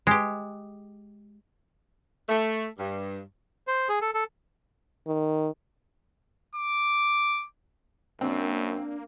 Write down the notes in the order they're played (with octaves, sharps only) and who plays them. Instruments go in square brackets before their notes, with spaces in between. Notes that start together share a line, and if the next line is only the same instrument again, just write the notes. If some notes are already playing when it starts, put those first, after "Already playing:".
[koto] G#3 G4
[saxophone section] A3
G2
[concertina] C5
G#4
A4
A4
[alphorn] D#3
[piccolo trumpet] D6
[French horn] F#2 [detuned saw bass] A#3 [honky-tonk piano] C4 [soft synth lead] D4